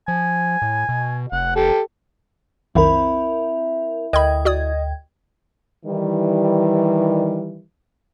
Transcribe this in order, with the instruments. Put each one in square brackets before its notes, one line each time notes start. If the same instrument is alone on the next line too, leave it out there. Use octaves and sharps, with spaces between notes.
[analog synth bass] F3 [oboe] G#5
[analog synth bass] A2
B2
[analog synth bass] F1 [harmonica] F#5
[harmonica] G4 A4
[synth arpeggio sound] B1 F2 D#3 [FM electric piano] C4 A#4 [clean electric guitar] E4
[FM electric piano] D2 G5 G#6 [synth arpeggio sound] A#4 B5 [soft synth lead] D#5
[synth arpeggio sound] F#4 D5 D#6
[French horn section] D#3 E3 G3